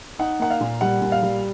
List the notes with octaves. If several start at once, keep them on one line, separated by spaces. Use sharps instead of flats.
D#4 F#5
A#3 F#5
F5
A#2
G3 F#5
A#2
F5
G3